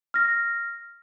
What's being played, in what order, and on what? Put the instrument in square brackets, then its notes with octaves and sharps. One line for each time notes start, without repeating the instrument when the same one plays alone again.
[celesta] F6 A#6